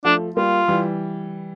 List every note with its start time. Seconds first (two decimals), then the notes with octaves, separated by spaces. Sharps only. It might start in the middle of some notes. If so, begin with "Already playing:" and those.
0.05 F3 A3 D4
0.36 G3 A#3 F4
0.68 E3 G3